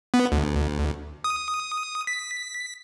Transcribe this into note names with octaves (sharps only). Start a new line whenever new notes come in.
B3
D2
D#6
B6